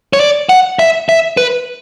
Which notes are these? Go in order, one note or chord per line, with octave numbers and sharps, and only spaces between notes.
C#5
D5
F#5
E5
E5
B4